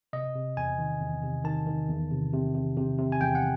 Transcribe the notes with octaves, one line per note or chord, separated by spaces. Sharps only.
C3 D#5
C3
E2 G#5
D#3
E2
C3
D#3 A5
D#3
E2
C3
C3
C3
C3
C3
G#5
E2 G5
F#5